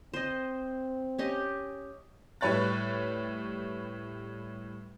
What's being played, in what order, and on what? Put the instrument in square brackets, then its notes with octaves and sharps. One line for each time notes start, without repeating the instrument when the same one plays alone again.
[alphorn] C4 [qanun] C5 D#5
[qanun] C#4 G4 D#5
[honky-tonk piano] A2 G3 B4 C#5 F#6 A6